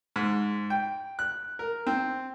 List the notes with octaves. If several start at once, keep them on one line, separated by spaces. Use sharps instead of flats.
G#2
G5
F#6
A#4
C4